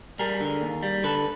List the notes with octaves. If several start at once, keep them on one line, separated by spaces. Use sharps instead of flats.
G3 G#4 A#4
D3
D#2
G3
D3 A4 B4